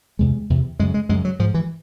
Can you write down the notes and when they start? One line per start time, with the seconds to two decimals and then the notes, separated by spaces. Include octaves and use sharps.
0.19 E2 C3 G#3
0.50 E2 C3
0.79 F#2 G#3
0.82 C#3
0.94 G#3
1.09 F#2 G#3
1.12 C#3
1.25 F#3
1.39 G#2 F3
1.54 E3